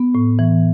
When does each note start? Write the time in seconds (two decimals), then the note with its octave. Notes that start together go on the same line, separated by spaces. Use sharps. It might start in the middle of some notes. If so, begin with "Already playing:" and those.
Already playing: B3
0.15 A2
0.39 E3